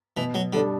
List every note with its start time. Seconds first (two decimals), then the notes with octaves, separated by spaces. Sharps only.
0.17 B2 E3
0.34 F#3
0.53 D3 G3 D4